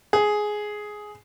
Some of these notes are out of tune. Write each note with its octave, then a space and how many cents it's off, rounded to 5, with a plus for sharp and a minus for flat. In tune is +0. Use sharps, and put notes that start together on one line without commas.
G#4 +10